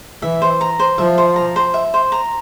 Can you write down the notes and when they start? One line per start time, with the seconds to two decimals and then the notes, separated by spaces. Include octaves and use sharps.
0.22 E3 E5
0.42 C5
0.61 A#5
0.79 C5
0.98 F3 E5
1.18 C5
1.36 A#5
1.56 C5
1.74 E5
1.94 C5
2.12 A#5